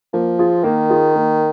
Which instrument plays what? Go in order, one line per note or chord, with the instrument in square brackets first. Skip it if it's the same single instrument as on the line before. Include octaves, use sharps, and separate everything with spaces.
[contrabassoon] F3 [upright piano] A#3
[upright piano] F4 G#4
[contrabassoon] D#3 [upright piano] A#3
[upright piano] F4 G#4
A#3